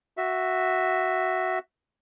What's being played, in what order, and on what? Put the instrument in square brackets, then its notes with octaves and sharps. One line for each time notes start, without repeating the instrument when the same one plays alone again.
[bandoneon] F#4 E5